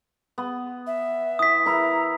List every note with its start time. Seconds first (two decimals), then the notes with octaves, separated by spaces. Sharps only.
0.38 B3
0.87 E5
1.39 E3 D#6 B6
1.65 E4 A#4 B4 A#5